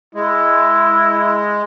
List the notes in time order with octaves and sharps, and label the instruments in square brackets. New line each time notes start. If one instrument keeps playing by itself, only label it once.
[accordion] G#3 [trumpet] E4